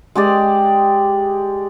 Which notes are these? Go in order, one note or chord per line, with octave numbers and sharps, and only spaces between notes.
G#3 G4 D5